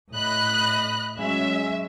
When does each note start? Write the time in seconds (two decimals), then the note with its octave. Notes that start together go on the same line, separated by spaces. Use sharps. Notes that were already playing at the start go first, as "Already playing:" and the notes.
0.15 A2 D#5 B5 F#6
1.19 F#3 G#3 C#4 E5